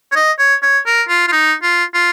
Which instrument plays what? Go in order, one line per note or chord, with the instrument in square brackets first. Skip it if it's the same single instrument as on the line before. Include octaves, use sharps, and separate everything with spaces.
[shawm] C#5
D#5
C#5
C#5
A#4
F4
F4
D#4
F4
F4